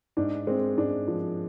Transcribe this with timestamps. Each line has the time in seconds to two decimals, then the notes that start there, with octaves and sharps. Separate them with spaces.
0.17 G#2 D4
0.47 G#3 C4
0.78 G#2 D4
1.08 F3